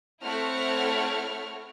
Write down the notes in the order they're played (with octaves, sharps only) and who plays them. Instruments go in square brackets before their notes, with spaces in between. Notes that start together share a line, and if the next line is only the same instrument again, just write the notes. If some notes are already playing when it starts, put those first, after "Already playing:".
[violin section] A3 C4 E4 C#5 F#5 F6